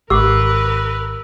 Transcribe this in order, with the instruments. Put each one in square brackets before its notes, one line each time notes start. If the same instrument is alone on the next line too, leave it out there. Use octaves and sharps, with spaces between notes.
[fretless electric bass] G#1 [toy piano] G4 F#5 D6 [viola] A#4 B4 [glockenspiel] E6